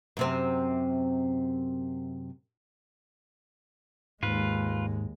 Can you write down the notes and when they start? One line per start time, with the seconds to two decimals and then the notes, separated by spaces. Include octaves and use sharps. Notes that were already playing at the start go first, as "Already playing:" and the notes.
0.17 F#2 C3 C4
4.23 D#2 G#2 G#3 F4 B4